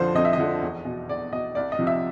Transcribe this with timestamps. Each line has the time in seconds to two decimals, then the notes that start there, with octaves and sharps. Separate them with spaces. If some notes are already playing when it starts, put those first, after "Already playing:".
Already playing: F2 D3 F3 C5
0.15 F2 D#5
0.25 E5
0.33 D#5
0.38 D3 F3
0.62 E2
0.85 B2
1.09 E2 D5
1.32 B2 D#5
1.55 C2 D5
1.72 D#5
1.79 C3 F3
1.87 E5